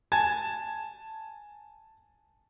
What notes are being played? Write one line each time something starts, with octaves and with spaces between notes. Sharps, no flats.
G#5 A5 G#6